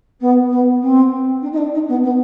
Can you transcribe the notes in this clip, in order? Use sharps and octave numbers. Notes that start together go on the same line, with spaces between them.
B3
B3
C4
D4
D#4
D4
D#4
B3
B3